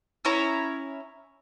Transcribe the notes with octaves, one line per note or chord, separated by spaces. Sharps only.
C#4 E4 C#5 A#5